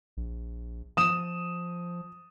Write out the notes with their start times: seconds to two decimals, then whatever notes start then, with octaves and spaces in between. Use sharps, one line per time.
0.17 A#1
0.97 F3 D#6 E7